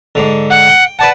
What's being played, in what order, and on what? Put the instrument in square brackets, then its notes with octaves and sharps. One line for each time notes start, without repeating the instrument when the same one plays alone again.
[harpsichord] G#2 D3
[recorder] F#5
[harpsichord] G5
[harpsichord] B4 D5 F#5 [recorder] A5